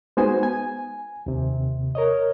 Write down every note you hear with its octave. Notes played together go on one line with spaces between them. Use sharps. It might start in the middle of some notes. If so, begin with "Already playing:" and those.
G#3 B3 D#4 F#4 C5 G#5
G#5
D#2 C3
A#4 C#5 D#5